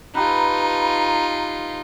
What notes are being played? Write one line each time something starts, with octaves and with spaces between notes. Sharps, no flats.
D#4 F4 G4 A4 B4 A#5